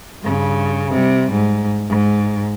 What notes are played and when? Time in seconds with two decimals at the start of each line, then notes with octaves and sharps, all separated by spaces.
0.23 G2 C#3
0.91 C3 G3
1.32 G#2
1.89 G#2